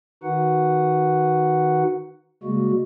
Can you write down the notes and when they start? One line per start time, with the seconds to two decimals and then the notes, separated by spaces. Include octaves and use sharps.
0.23 D#3 D#4 F#4 B4 F#5
2.43 C#3 G3 G#3 A#3 F#4